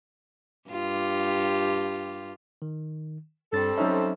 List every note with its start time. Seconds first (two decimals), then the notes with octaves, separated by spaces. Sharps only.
0.70 G2 F4 G4
2.62 D#3
3.53 G2 G3 C4 A4 A6
3.78 F#3 C#4 D#4 C5 E5